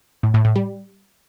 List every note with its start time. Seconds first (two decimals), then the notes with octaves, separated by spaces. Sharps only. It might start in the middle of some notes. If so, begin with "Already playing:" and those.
0.23 A2
0.34 A2
0.45 A2
0.56 G3